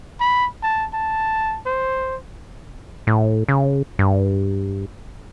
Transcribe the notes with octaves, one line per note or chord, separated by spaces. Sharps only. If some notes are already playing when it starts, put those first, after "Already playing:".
B5
A5
A5
C5
A2
C#3
G2